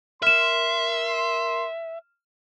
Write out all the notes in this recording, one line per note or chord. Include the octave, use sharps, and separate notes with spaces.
A#4 E5 C6 F6 E7